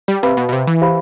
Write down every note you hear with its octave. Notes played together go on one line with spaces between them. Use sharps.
G3
C3 B4 F5 B5
B2
B2
C3
E3
G4 C5 F5 B5